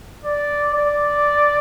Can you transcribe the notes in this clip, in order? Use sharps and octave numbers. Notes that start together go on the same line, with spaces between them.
D5
D5